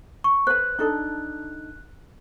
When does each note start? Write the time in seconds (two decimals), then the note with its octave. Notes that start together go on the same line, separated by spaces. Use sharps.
0.24 C#6
0.47 B4 C5 F#6
0.79 D4 D#4 A4